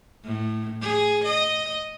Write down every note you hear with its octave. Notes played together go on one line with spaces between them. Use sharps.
A2
G#4
D#5